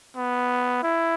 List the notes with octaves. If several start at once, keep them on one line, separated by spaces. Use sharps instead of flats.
B3
E4